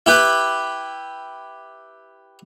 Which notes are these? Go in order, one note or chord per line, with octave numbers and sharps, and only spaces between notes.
E4 G4 B4